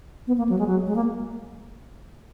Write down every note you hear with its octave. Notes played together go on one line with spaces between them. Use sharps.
B3
A#3
F#3
G#3
F#3
G#3
A#3